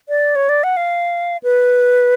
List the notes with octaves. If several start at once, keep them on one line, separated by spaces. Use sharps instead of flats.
D5
C#5
D5
F#5
F5
B4